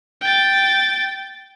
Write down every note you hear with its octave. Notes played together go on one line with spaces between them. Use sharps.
G5 A6